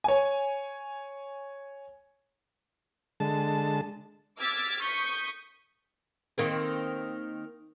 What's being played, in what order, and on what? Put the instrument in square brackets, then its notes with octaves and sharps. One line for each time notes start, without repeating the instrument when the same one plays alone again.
[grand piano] C#5 G#5
[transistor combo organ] D3 G#3 A5
[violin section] D6 E6 F6 G#6 A6 B6
C#6 D#6 G6 B6 C#7
[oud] D#3 A#3 C4